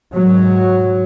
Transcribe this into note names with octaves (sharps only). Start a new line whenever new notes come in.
G#2 F#3